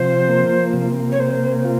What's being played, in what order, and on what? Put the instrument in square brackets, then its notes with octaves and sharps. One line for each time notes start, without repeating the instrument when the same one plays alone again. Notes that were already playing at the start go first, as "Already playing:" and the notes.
Already playing: [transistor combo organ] C3 F3 [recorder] C5
[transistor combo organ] A#3
C3
[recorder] C#5
[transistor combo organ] A#3 [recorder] C5
[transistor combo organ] F4